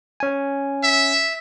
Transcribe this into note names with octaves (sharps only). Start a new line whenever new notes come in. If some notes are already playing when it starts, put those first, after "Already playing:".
C#4 G#5
E5